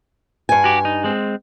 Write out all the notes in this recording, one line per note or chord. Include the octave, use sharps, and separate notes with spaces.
G2 G#5
F#4 G4
D#4
G#3 C4